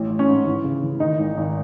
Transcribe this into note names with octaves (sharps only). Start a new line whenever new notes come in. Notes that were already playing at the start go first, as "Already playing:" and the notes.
Already playing: A1
A1
C#4
G#2
E3
C#3
E3
D#3 D#4
G#1
G#1